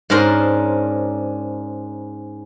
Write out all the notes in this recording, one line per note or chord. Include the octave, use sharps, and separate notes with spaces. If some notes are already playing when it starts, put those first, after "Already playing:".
G#2 C#4 D4 A#4 C5